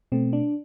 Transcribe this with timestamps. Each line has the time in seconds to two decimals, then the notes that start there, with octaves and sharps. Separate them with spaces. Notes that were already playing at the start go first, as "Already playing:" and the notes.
0.12 B2 A3 C4
0.33 D4